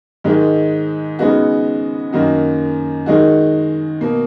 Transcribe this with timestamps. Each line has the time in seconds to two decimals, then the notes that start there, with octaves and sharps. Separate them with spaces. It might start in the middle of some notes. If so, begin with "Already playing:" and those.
0.24 G#2 D#3 G#3 D#4
1.19 C#3 G#3 B3 D#4 F#4
2.13 F#2 D#3 A#3 D#4 F#4
3.06 D#3 G#3 D#4 F#4
4.01 B2 A#3